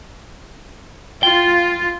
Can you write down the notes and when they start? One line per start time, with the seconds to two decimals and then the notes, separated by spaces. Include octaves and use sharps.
1.23 F4 G5